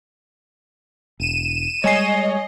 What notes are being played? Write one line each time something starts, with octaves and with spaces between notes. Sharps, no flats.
E1 D#7 E7
G3 G#3 C#5 D#5 G#5 C7